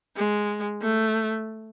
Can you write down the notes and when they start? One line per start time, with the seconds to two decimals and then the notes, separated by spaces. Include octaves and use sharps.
0.16 G#3
0.82 A3